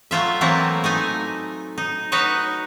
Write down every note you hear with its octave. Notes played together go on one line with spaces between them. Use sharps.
F#3 A3 F4 E5
E3 F#3 A3 A#3 C4 E4
A3 D#4 G#5
D#4
D#4 F#4 B4 C#5 D#5